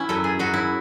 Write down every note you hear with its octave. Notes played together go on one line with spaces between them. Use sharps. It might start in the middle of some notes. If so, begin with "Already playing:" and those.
Already playing: B3 C#4 E4
F#2 A4
G#4
F#2 F#4
E4